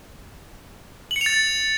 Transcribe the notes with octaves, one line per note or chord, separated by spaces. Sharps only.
F#7
C#7
F7
A6